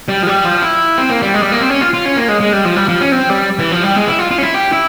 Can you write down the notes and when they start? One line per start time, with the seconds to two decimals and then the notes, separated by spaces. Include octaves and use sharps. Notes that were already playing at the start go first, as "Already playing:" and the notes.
0.08 G3
0.23 F3
0.27 G3
0.45 F3
0.62 E4
0.98 C4
1.10 A#3
1.22 G3
1.34 G#3
1.43 G3
1.52 A#3
1.60 C4
1.70 C#4
1.81 F4
1.94 F4
2.06 C#4
2.16 A#3
2.28 G#3
2.40 G#3
2.53 G3
2.65 F3
2.76 G3
2.89 F3
3.01 C#4
3.12 C4
3.30 G3
3.59 E3
3.72 F3
3.83 G3
3.96 G#3
4.08 E4
4.19 F4
4.31 F4
4.38 C#4
4.43 E4
4.54 G4
4.73 E4